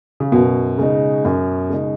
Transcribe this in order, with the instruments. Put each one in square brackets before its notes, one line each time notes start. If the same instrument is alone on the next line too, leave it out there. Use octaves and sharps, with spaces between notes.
[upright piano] C#3
[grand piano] F#2 [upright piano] B2
[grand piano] C#3 G#3 D#4
F#2
C#3 G#3 D#4